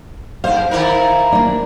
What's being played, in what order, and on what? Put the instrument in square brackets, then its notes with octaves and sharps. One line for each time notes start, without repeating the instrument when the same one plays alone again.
[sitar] G#2 C5 [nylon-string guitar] F5
[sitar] D#3 E4 A#4
[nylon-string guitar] A#3 D4